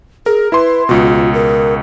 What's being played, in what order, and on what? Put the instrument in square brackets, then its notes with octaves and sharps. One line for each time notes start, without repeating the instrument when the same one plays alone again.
[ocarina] G#4 [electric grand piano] A#4
[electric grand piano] E4 C6 [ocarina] B4
[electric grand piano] C#2 B2 [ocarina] F4
[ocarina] A#4